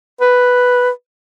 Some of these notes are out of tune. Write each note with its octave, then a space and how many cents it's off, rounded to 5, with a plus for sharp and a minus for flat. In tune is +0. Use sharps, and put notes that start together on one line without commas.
B4 +0